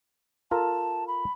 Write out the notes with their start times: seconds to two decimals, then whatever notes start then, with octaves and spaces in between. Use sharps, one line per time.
0.51 F4 A4 A#4 A5
1.08 B5